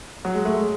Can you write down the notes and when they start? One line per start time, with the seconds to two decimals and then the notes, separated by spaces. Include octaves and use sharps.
0.25 F#3
0.34 G#3
0.45 A3
0.56 G#3